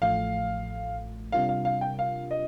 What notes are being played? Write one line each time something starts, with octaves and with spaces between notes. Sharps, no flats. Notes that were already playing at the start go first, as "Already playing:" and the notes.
A1 A2 F3 A3 F5
C3 G3 D4 F4 A#4 F5
F5
F5
G5
F5
D#5